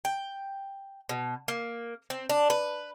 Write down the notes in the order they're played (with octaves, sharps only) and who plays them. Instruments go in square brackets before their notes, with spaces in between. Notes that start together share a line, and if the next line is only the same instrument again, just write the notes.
[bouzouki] G5
B2
A#3
C4
D4
B4